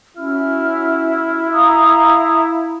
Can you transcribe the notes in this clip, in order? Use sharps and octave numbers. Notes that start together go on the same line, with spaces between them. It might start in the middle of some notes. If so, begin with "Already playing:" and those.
C#4 E4 F#4 F6
F5 A#5 D#6